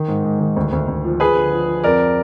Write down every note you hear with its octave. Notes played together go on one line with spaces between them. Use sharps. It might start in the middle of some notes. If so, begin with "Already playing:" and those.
Already playing: D#3
G#2
G#2
D#3
D2
D2
D2
F3
F3 G#4 B4
D3
F3
F3
F2 A#4 D5